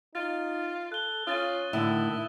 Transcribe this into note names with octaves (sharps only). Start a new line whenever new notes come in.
D#4 F4 A6
A4 F#6 G7
C#4 F4 D#6 A6 D#7
A2 D3 D#3 E4